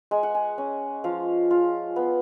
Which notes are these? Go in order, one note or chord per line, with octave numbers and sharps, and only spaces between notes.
G#3 G#5
F#5
G#5
C#4
F3 F5
F4
B3